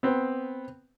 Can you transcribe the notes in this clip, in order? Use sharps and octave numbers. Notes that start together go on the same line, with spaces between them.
B3 C4